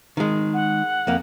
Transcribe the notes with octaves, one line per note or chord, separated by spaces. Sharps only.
D#3 G#3
F#5
F2 A#3